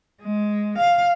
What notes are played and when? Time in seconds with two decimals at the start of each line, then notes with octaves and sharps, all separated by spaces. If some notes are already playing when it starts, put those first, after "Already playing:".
0.23 G#3
0.78 F5